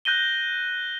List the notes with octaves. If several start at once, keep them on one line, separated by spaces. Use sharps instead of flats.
F#6 G6 A#6 D#7 G7